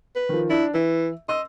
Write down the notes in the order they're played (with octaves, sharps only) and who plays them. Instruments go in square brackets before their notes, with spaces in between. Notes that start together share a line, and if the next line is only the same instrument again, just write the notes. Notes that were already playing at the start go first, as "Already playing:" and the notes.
[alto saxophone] B4
[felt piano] D#3 F3
[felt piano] D4 [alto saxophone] E4
[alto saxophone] E3 [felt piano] E5
[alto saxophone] D#5 [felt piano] C6 E6